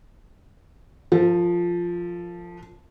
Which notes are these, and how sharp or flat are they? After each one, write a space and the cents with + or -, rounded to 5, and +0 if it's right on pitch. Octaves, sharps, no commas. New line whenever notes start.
F3 +0 A4 +40